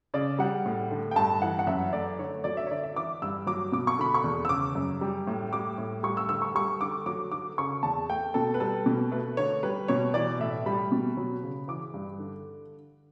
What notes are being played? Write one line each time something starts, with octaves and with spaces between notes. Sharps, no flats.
C#3 D5
G3 F#5
A2
D3
G5
G2 A5
E3 F#5
F#5
F#2 E5
A3 D5
D3 C#5
F#3 D5
E5
C#5
D3 D5
E5
E3 D6
G2 E6
F#3 D6
B2 D6
C#6
D3 B5
C#6
E2
E6
C#3 D6
F#2
G3
A2
G3 D6
A2
G3 C#6
E6
D3 E6
C#6
G3 C#6
D3 D6
F#3 D6
D3 D6
C#3 C#6
E2 A5
A3 G5
B2 A4
B4
G3 A4
B2
A3 B4
D3 C#5
G3 B4
B2 C#5
E3 D5
A2 E5
G3 B5
B2
F#3
C#3
E3 D6
G2
D3